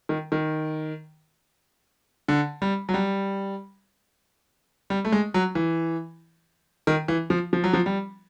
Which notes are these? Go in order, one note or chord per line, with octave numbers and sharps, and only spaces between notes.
D#3
D#3
D3
G3
F#3
G3
G3
A3
G#3
F#3
E3
D#3
E3
F3
F3
F#3
F3
G3